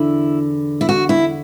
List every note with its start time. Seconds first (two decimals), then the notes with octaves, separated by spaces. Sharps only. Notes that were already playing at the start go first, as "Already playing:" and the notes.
Already playing: E2 D3 E4
0.81 E4
0.89 F#4
1.09 E4